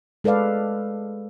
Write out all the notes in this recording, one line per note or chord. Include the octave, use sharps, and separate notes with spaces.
G#3 A4 B4 D5 F5